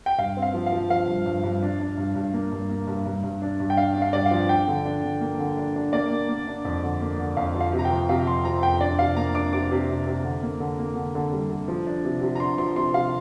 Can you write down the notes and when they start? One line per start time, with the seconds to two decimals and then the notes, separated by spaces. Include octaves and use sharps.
0.06 G5
0.18 G2 F5
0.37 C4
0.42 F5
0.54 F3
0.66 F5
0.72 F3
0.90 F3 F5
1.08 G2
1.26 G2
1.43 G2
1.63 D4
1.80 D4
1.98 G2
2.15 G2
2.33 A#3
2.52 G2
2.70 A#3
2.87 G2
3.06 G2
3.23 G2
3.42 D4
3.60 G2
3.70 G5
3.77 D4 F5
3.95 D4
4.02 F5
4.13 G2 D5
4.26 F5
4.31 F3
4.49 D4 G5
4.68 D3
4.85 D4
5.04 D3
5.21 A#3
5.39 D3
5.57 D4
5.76 D4
5.93 A#3 D5
6.11 A#3
6.29 A#3
6.47 D4
6.65 F2
6.84 D3
7.01 A#3
7.19 D3
7.37 F2 F5
7.55 F3
7.61 F5
7.73 C3
7.79 A#5
7.85 G5
7.91 F3
8.09 C3 F5
8.26 F2 C6
8.45 F3 A#5
8.63 F2 G5
8.81 D4 D5
8.99 C3 F5
9.16 A#3 A#5
9.35 D4 D6
9.53 C3 D6
9.71 C3
9.89 C3
10.07 C3
10.25 D3
10.43 A#3
10.60 D3
10.79 A#3
10.96 D3
11.15 D3
11.32 G3
11.50 D3
11.68 F3
11.87 D4
12.05 C3
12.22 C3
12.35 A#5
12.40 D4 C6
12.58 F3 C6
12.76 C3 C6
12.94 C3 F5